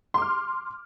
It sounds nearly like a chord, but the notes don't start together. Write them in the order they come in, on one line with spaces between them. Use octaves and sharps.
C6 D6 F6